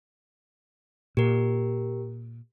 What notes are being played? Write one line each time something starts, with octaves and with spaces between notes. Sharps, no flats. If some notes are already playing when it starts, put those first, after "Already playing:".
A#2 G4 A#4